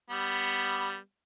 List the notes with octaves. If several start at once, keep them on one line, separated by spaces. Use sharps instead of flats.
G3 B3